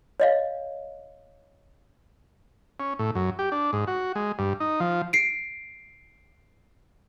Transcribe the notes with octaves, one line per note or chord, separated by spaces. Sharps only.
C#5 D#5 F5
C#4
A2
F#2
G4
D4
G#2
F#4
G#3
G2
D#4
F3
C7 D7